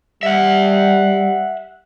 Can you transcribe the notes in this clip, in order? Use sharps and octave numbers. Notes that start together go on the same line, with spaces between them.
G3 E5 F#5